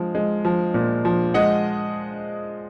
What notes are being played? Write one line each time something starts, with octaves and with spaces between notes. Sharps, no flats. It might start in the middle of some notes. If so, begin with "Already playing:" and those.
Already playing: F3 G#3
G#3
F3
A#2
F3
G#3 D#5 F#5